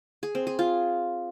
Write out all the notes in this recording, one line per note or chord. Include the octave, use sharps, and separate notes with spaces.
G#4
C4
G#4
F4